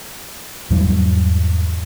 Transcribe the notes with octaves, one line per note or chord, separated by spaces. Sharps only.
E2 G#2 F#3 G3